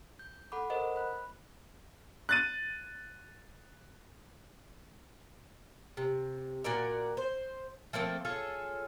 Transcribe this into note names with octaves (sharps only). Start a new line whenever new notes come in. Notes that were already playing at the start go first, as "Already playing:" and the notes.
G6
A4 F#5 B5 D6
A#4 C5 D#5 F#5
B5 F#6
F#6 A6 D#7
C3
A#2 F#4 A#4 D5
C5
F3 A3 A#3 C4
F4 G#4 A4 C#5